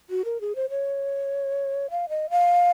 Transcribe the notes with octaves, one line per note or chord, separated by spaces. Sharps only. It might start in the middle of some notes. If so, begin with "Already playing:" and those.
F#4
A#4
G#4
C5
C#5
F5
D#5
F5